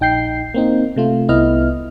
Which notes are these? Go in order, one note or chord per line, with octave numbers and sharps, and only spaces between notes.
A#1 D#4 G5 G6 C7
A#3 C4 D#4
C3 A3 F4
C2 B3 E4 D#5 F6